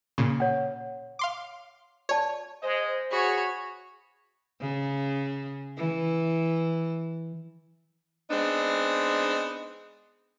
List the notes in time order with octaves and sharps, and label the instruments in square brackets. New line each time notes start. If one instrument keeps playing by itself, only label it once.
[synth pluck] A#2 C#3 [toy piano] C#6
[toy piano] C#5 F#5
[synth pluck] F5 C6 D6
[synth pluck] C#5 [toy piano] D5 A5
[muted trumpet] G#3 [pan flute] C5 [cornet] D#5
[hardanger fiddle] F#4 B5 [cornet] G#4 [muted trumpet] C#5
[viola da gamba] C#3
E3
[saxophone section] G#3 B3 C4 D4 D#4